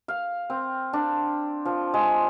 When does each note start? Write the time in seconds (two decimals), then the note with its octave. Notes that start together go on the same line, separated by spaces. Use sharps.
0.08 F5
0.50 C4
0.93 D4
1.65 F3
1.94 G#3